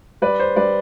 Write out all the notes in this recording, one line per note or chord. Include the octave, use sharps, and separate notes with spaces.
G3 B4 D5
C5
G3 B4 D5